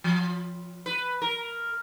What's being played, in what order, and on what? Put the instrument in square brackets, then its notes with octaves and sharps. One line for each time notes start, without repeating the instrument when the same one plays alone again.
[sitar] F3
B4
A#4